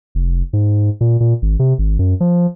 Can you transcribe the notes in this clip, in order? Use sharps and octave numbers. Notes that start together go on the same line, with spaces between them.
F1
G#2
A#2
A#2
G#1
C3
G#1
F#2
F3